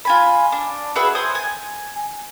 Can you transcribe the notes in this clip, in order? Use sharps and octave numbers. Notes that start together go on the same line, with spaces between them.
F4 G#5 B5
D4
F#4 G#4 B4 E5
C5 G#5 D#6
G#5